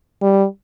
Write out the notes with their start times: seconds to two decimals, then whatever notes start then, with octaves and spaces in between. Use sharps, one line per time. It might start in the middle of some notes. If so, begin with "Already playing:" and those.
0.22 G3